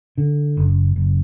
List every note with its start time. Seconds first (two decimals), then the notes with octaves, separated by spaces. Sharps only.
0.18 D3
0.57 F#1
0.96 F#1